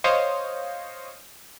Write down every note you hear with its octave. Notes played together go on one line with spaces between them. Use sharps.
C5 C#5 D#5 F5 C#6 D#6